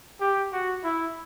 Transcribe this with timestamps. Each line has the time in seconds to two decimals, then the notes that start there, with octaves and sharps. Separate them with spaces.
0.20 G4
0.52 F#4
0.84 E4